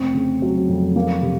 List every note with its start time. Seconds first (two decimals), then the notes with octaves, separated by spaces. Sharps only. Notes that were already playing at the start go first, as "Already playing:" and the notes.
Already playing: F1 C4
0.14 C#3
0.42 F#3
0.69 F2
0.96 A#3
1.22 C3